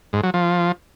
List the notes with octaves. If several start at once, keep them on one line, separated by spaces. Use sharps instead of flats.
G#2
F#3
F3